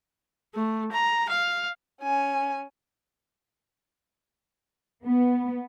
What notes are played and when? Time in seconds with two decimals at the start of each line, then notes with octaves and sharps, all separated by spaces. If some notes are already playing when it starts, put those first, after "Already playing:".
0.54 A3
0.92 A#5
1.29 F5
2.01 C#4 G#5
5.05 B3